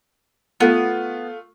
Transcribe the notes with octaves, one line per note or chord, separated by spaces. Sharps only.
A3 B3 F4